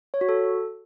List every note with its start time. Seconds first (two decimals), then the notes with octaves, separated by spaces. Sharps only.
0.14 C#5
0.21 F#4
0.29 A4